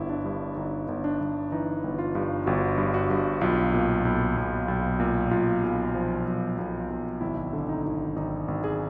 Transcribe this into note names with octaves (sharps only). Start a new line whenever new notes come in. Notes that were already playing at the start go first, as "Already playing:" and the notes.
Already playing: G1 G2 E4
D4
G2
G1 D#4
G1
D4
G1
E3 D#4
G1
F4
G2
G1 F#4
G2
F#4
G2
B1 F4
A#2
B1
B1
B1
A#2
B1 F4
B1
F3
B1
B1
B1
G#1 E4
D3
D#4
G#1
G#1 D#4
G#1
G#4